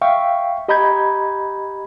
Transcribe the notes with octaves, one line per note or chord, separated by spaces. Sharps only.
E5 F5 G5 C#6
G4 D#5 A#5 B5 G6 G#6